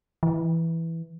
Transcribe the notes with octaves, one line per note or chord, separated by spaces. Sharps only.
E3